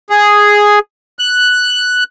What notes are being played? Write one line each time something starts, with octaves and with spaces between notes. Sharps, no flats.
G#4
F#6